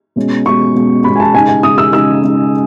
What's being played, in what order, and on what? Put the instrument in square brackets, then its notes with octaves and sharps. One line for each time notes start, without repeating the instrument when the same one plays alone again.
[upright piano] B2 G#3 C#4
B2 G#3 C#4 C#6
B2 G#3 C#4
B2 G#3 C#4 B5
G#5
A5
C#3 G#3 D#4 G#5
G#5
C#3 G#3 D#4 D#6
E6
C#3 G#3 D#4 E6
C#3 G#3 D#4